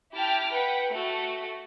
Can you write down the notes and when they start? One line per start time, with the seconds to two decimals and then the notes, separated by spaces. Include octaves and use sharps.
0.15 E4 G4 G5 A5 F6 D7
0.50 B4 F#5 G5
0.91 A3 F#4 A4